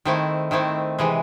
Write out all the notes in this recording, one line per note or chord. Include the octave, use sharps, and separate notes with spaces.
D#3 A3 C4 E4
D#3 A3 C4 E4
C3 E3 G#3